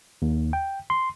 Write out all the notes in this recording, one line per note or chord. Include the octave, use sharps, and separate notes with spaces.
D#2
G5
C6